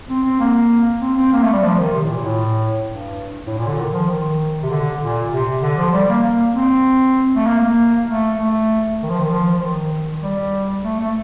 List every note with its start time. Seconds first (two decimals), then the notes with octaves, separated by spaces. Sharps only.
0.09 C4
0.25 C4
0.40 A#3
1.01 C4
1.17 C4
1.32 A#3
1.43 A3
1.53 G3
1.63 F3
1.79 D#3
1.93 C3
2.04 A2
2.09 A#2
2.24 A2
2.86 G2
3.47 A2
3.58 A#2
3.67 D3
3.78 D#3
3.94 F3
4.08 D#3
4.63 C3
4.70 D3
5.01 A#2
5.31 C3
5.62 D3
5.77 F3
5.93 G3
6.09 A#3
6.24 A#3
6.54 C4
7.36 A3
7.46 A#3
7.62 A#3
8.08 A3
8.38 A3
9.03 D#3
9.10 F3
9.20 D#3
9.30 F3
9.53 F3
9.61 D#3
10.22 G3
10.84 A3
11.00 A3